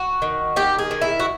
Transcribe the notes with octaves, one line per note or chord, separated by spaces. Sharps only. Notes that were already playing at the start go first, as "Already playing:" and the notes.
Already playing: F#4
D#3
D#3 G4
G#4
D#3
E4
F#4